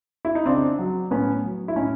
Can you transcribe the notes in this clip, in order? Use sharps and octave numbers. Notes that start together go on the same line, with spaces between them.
E4
D#4
C#3 C4 D4
F#3
A2 B3 C#4
F#3
E4
A2 C#4 D#4